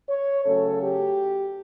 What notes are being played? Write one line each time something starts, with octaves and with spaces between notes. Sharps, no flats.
C#5
C#3 F#3 A3 C#4 A4
G4